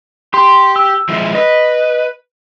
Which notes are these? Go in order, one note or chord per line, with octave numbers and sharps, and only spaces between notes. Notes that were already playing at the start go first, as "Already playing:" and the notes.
G4 C6
E6
F3 G#3 E4
B4 D#5